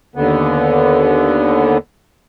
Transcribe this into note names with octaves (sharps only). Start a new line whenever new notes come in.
D#2 D3 B3